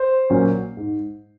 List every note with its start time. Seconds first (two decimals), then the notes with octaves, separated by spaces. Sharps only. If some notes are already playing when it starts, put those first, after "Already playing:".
Already playing: C5
0.30 A#2 F#3 A#3 C#4
0.77 G#2